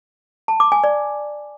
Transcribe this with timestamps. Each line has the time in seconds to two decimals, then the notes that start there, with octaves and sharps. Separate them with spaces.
0.48 A5
0.60 D6
0.72 G#5
0.84 D5